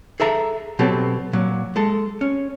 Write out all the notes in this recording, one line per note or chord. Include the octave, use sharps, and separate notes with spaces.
G#4 A4 E5 A#5
B2 F#3 C4 G4 A4
A#2 F#3
G#3 A4
C#4